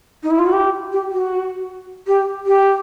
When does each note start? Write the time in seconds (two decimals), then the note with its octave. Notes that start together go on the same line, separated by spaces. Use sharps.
0.23 D#4
0.30 E4
0.39 F4
0.46 F#4
0.53 G4
0.92 G4
1.12 F#4
2.07 G4
2.46 G4